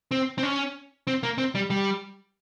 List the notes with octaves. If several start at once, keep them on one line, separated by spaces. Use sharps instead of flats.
C4
C4
C#4
C4
A#3
C4
G3
G3